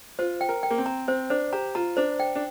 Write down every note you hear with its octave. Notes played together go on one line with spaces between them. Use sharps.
F4 C5
G5
A#4
G5
A#3
C4
A#5
C4 C5
D4 C5
G4 A#5
F4 A#5
D4 C5
G5
D4